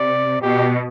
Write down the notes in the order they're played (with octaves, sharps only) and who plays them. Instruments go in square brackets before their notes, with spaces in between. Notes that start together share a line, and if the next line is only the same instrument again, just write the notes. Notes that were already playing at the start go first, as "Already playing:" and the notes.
Already playing: [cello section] C3 [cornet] D5
[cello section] B2 [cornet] G4